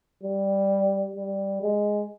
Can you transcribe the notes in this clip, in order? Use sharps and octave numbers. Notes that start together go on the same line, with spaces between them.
G3
G3
G#3